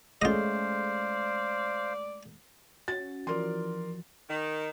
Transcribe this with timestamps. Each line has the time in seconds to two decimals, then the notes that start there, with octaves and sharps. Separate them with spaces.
0.22 G#3 A3 C#4 F4 C5 D5 D#5 F5
2.88 C#4 F#4 A6
3.27 E3 F3 A#4 D5 C6
4.29 D#3